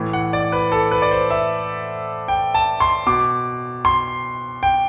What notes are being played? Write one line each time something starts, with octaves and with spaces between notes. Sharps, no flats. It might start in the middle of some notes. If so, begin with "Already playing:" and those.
Already playing: A2 E3
F#5
D5
B4
A4
B4
D5
C5
E5
G5
A5
C6
B2 D6
C6
G5